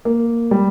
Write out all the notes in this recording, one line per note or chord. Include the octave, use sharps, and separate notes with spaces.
A#3
G3